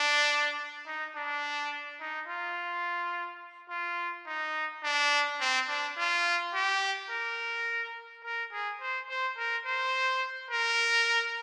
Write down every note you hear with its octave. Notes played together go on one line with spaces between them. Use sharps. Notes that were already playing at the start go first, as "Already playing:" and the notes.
Already playing: D4
D#4
D4
D#4
F4
F4
D#4
D4
C4
D4
F4
G4
A#4
A#4
G#4
C5
C5
A#4
C5
A#4